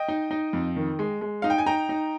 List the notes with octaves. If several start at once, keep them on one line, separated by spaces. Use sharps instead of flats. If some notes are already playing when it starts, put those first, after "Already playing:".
Already playing: D#5 G5
D#4
D#4
F2
D#3
G#3
G#3
D#4 F5
G5
G#5
D#4 G5 A#5
D#4